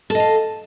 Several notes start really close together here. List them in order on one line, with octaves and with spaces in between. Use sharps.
A4 D#5 F5